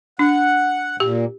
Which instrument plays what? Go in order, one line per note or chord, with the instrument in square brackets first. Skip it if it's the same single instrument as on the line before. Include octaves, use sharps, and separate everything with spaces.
[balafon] D4 [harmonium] F#5
[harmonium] A#2 [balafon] G4